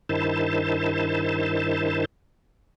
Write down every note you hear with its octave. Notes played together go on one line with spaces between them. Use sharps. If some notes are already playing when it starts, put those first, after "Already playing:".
G2 D#3 E4 C5 A5